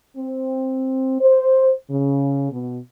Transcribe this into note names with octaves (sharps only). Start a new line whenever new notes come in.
C4
C5
C#3
B2